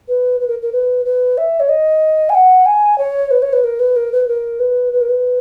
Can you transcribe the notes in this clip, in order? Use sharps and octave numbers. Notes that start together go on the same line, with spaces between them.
B4
B4
A#4
A#4
B4
B4
E5
C#5
D#5
G#5
F#5
G#5
C#5
B4
C#5
B4
A#4
B4
A#4
B4
A#4
B4
B4
A#4
B4